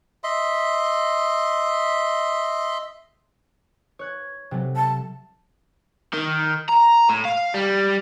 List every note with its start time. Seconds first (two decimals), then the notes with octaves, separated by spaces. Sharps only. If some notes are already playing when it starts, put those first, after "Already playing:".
0.24 D#5 E5 C6
3.99 C#5 F#6 G#6
4.51 C3 F#3 A3
4.76 A5
6.13 D#3
6.69 A#5
7.09 A2
7.25 F5
7.54 G3